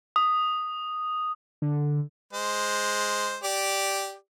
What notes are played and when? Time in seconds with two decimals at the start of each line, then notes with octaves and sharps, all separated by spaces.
0.16 D#6
1.62 D3
2.33 G#3 C5
3.43 G4 D5